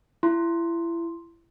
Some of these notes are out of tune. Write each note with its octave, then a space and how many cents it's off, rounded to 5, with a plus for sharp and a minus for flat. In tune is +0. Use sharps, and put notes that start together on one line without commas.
E4 +30 C6 +0